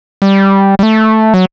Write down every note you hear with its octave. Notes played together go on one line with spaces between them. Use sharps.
G3
G3
A3
F#3